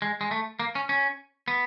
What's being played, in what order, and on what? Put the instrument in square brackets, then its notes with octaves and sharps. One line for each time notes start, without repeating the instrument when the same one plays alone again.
[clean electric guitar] G#3
G#3
A3
A#3
C#4
C#4
B3